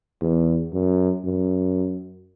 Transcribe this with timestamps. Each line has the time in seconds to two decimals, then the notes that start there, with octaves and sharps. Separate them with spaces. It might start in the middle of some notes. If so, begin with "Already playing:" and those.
0.21 E2
0.73 F#2
1.24 F#2